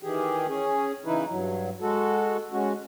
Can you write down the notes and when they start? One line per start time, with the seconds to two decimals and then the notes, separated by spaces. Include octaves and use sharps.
0.03 D#3 E3 G4 G#4
0.48 C#4 G#4
1.06 C#3 E3 D#4 E4 B4
1.29 G2 F#3
1.81 G#3 F#4 A4
2.52 G#3 C#4 F#4